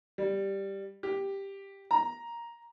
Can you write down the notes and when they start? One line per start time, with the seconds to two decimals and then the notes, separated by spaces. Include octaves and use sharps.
0.18 G3
1.03 G4
1.91 A#5